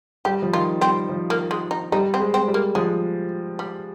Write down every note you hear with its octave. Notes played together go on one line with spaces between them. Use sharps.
G3 G4
F3
D#3 F4
G3 C4
F3
A#3
G#3
D#4
G3 D#4
C4
G#3
C4
G3
A#3
F3 G#3
G3